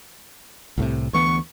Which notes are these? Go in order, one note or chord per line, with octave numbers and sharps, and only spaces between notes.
C2 A2 C3
D2 E3 B3 C#6